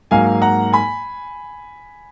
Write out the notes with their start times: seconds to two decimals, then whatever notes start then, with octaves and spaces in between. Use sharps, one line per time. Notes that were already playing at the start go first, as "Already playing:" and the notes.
0.11 G#2 F#3 A#3 F5 G#5
0.42 F#5 A#5
0.73 G#5 B5